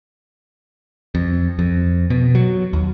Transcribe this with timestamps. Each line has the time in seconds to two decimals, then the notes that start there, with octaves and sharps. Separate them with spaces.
1.15 F2
1.59 F2
2.10 B2
2.35 F#3
2.73 D#2